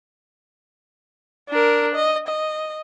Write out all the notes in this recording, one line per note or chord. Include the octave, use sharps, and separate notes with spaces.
D4 A#4
D#5
D#5